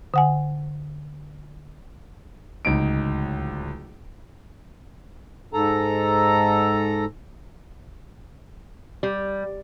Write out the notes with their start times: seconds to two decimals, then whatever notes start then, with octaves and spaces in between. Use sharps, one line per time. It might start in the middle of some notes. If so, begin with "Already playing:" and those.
0.14 D3 F#5 G#5
2.65 D1 C#2 D#4 D7
5.53 G#2 A4 A#5
9.03 G3